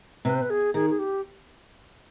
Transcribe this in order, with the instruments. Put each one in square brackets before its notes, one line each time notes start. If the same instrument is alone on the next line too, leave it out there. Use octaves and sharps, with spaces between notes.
[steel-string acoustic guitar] C3 [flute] B4
[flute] C5
B4
G#4
[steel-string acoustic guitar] D#3 [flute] G#4
[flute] G#4
G4